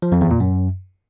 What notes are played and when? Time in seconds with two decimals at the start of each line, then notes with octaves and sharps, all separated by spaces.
0.02 F3
0.12 F2
0.21 E2
0.31 A#2
0.40 F#2